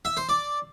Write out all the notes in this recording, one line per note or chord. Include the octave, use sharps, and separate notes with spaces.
E5
C5
D5